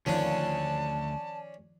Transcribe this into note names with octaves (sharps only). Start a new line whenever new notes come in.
D2 D#3 F3 C#4 D4 F4 A5